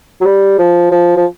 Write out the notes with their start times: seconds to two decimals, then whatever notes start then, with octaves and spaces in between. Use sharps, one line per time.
0.21 F#3
0.25 G3
0.59 F3
0.92 F3
1.17 F3